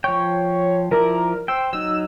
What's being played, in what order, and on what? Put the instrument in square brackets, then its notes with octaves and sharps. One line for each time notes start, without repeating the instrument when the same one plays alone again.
[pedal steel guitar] F3 G5 [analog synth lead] C#5
[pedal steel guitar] F3 E4 D5 [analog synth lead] A#4
[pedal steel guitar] C5 G5 [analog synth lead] E6
[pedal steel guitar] F#3 D#4 [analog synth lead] E6